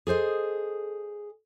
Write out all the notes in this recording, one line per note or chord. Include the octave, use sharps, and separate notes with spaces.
G#4 A4 C5 D#5